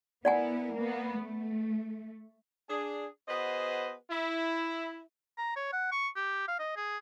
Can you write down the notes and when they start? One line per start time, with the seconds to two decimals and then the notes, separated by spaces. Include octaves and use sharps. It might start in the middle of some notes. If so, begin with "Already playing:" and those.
0.25 B3 E4 A#4 D5 F#5 G#5
0.74 A#3 B3
1.18 A3
2.70 D4 G#4
3.29 B3 F#4 G#4 B4 C5 D#5
4.11 E4
5.38 A#5
5.56 C#5
5.72 F#5
5.92 C#6
6.16 G4
6.48 F5
6.59 D#5
6.76 G#4